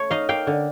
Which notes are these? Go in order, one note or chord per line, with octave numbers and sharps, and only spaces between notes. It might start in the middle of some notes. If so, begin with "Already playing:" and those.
Already playing: A3 C#5
D#4 D#5 F5
A#3 F5 G5
D3